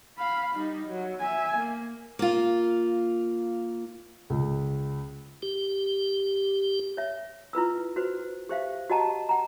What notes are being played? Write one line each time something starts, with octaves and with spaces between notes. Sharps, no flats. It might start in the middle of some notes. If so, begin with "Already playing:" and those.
F5 B5
G3 D#4
F#3
E5 G#5
A#3
A#3 F4
C#2
G4
C#5 E5
E4 F4 B4 E6
F#4 B4 C5
G4 C5 E5 F5
F#4 G4 D#5 F#5 A5 A#5
F#5 A#5